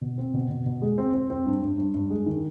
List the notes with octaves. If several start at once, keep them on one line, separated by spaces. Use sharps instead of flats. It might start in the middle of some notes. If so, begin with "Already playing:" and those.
B2
C4
B2
B2
B2
G#3
C4
C4
C4
G2
G2
G2
G2
G#3
D#3